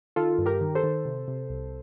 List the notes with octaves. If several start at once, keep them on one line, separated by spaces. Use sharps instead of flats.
D#3 F4 A4
G2
G4 A#4
D#3
A4 C5
D#3
C3
C3
C2